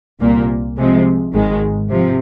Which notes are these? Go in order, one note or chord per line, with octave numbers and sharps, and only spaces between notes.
C2 A#2 A#3
C3 F3 G#3
G#1 G#2 D#3 G#3
C3 F3